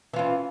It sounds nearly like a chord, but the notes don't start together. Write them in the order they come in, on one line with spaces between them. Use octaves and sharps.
E3 F4 C#4